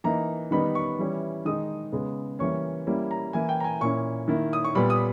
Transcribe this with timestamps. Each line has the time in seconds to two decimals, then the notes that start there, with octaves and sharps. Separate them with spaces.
0.04 E3 A#3 D#4 A#5
0.51 D#3 G3 B3 D#4 B5
0.75 C#6
0.99 E3 G3 C#4 E4
1.45 D#3 G#3 D#4 D#6
1.92 C#3 G#3 B3
2.39 E3 G3 A#3 C#4 C#6
2.86 G3 A#3 C#4 E4
3.11 A#5
3.33 E3 A#3 E4 G#5
3.49 G5
3.60 A#5
3.64 G#5
3.80 A#2 A#3 C#4 E4 C#6
4.28 D#3 A#3 E4
4.53 D#6
4.64 C#6
4.75 A#2 G3 B3 B5
4.90 D#6